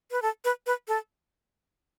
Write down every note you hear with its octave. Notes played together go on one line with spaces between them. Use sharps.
B4
A4
B4
B4
A4